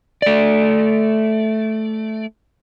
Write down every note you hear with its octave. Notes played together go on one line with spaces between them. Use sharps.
A3 D5